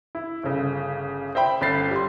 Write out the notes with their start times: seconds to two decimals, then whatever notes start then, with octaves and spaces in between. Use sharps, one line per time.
0.15 E4
0.43 G1 C#3
1.35 C5 E5 G5 B5
1.61 G1 C#4 B5 A6 C7
1.91 G3 C6